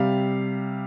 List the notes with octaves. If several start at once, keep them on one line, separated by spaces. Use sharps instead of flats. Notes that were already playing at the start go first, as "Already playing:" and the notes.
Already playing: C3 G3 F5